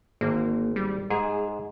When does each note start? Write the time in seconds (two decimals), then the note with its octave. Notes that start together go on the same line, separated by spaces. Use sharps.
0.21 G#1 D3 A#3
0.76 G3
1.10 G#2 G#4